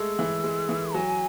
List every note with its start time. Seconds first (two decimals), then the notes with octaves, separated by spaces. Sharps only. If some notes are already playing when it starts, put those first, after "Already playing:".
Already playing: G#3 A3 E6
0.19 E3
0.44 G#3
0.69 E3
0.94 F#3 G#5